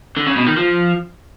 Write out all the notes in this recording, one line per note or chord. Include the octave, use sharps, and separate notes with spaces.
D3
C#3
B2
D#3
F3